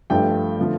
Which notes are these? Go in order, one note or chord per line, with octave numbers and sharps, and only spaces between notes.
G2 F3 A3 G5
D3 F3 A3